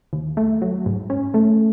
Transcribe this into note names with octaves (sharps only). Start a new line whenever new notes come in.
D#2
A3
F#3
G#2
C#4
A3